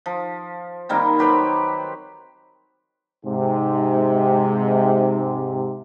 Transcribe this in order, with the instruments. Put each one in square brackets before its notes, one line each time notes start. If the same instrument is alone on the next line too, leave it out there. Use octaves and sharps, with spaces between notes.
[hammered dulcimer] F3
D#3 G3 A#3 C4
F#3 G4 B4 C5
[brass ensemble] G#2 C3